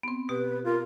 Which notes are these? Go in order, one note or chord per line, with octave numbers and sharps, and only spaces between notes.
B3 C4
B2 G4 B4
F4 A#4